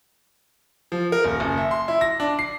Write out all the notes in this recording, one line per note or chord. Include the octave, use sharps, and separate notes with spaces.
F3
A#4
D#1
F#1
E5
C6
E4
A#6
D4
C7